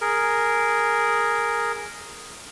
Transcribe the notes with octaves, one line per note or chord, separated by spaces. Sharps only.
G#4 A#4